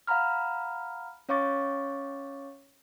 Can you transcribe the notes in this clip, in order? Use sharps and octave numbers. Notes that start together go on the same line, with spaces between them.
F5 F#5 A#5 B5 F6
C#4 C#5 F5 C#6 D6 A6